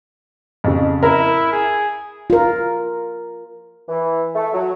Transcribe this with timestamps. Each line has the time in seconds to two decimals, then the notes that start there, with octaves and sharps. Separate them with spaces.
0.64 F2 C#3
1.03 E4 A#4
1.52 G#4
2.30 F4 A#4
3.88 E3
4.35 A3
4.54 F#3